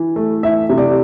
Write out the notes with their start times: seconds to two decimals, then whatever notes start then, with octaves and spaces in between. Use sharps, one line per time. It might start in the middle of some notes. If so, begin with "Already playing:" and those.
Already playing: E3
0.16 A3
0.43 E3 E5
0.69 C3
0.78 D5